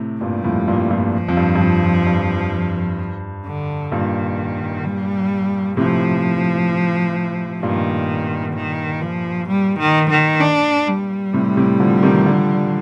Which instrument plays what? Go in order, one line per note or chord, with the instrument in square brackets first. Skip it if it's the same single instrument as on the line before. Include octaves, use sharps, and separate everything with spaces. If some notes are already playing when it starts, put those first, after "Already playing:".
Already playing: [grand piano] A2 C3
[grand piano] G2 A#2 [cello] G3
[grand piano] F2 A2
G2 A#2
G2 A#2
[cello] F3
[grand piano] F2
G2
G2
F2
F2
G2
[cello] D3
[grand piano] G2 A#2 [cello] D#3
[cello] G3
[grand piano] A2 C3 [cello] F3
[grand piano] G2 A#2 [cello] D#3
[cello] D#3
F3
G3
D#3
D#3
D4
G3
[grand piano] A2 C3
A2 C3
D3 F3
C3 D#3
D3 F3